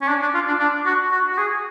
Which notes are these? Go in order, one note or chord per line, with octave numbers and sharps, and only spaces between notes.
C#4
D4
D4
F4
D4
D4
F#4
F#4
F#4
G#4